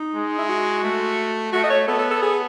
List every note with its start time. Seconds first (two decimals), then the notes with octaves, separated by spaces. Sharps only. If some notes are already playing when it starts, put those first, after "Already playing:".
Already playing: D#4
0.15 G#3
0.39 E4
0.50 F#4
0.83 A3
1.53 A3 F#4
1.64 D#5
1.70 C#5
1.88 B3 A4
1.99 A4
2.11 A4
2.22 G#4